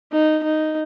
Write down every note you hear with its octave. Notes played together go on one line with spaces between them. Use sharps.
D#4
D#4